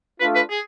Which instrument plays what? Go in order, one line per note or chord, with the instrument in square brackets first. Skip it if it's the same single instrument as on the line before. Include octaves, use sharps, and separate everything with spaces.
[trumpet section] A3 D4 F4 [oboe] B4
[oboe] B4
G#4